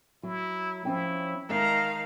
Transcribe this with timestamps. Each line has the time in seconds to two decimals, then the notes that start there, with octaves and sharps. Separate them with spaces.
0.23 F#3 E4
0.85 F3 C#4 E4 G5
1.49 D#3 G#3 E5 F5 A5 A#5